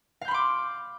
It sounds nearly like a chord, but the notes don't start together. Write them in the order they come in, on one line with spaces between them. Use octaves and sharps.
F5 G6 B5 C6 D6